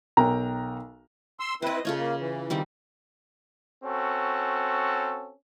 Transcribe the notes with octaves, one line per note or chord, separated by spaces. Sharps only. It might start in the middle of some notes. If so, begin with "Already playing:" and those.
B1 A#4 G5 A#5
C6 E6
C4 E4 B4 C5 D#5
C#3 A3 F4 C#5
A#3
E3
D#3 G3 C4
C4 C#4 F#4 A4